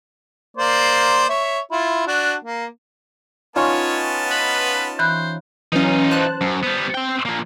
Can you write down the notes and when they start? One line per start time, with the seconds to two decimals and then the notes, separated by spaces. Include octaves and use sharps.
0.57 A#3 C5 D5
1.29 C#5 E5
1.71 E4 F4
2.07 D4 F#4
2.45 A#3
3.56 B3 C#4 D#4 F4 C#5 A5
4.30 B4
4.99 E3 C5 B5 F#6
5.73 E3 F#3 C#4 D#4 F4
6.11 C5 A5 F#6
6.41 F#2
6.63 G3 B3
6.95 C4 G5
7.26 F3 A#3